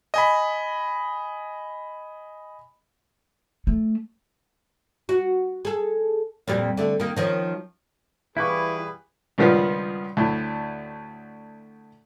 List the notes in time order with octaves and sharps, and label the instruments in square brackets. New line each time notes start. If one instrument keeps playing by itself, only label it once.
[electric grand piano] D#5 G#5 B5
[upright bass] A3
[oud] F#4
G#4 A4
F2 A#2 G3
D3 A3
D#3 A#3
D#3 F3 C#4
[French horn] E3 [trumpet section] G3 G#4 B4 [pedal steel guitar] E4 [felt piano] F5 C#6 D6
[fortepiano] C#2 G2 D#3 F3 B3 F5
D2 A2